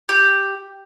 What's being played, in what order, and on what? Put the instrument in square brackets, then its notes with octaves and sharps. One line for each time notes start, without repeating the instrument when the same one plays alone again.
[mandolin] G4